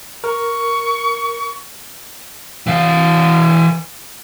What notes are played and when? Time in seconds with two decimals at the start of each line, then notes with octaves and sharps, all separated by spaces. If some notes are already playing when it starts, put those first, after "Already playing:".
0.24 A#4 C#6
2.67 E3 F5